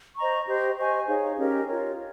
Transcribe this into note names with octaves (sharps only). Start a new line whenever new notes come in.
C5 D#5 A#5 C#6
G4 C5 D#5
C5 D#5 G#5 C#6
D#4 G#4 C#5 F5
C#4 G4 A#4 D#5
F4 A#4 C#5